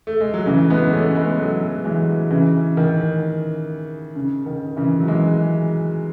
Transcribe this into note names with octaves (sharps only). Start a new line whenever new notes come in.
A3
G#3
F#3
C#3 E3
G#3 B3
A3 C#4
G#3 B3
F#3 A3
E3 G#3
C#3 E3
D#3
C#3
D#3
C#3 E3
F#3
E3 G#3